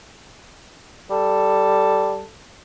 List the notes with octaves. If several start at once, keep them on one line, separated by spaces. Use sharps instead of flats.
G3 A4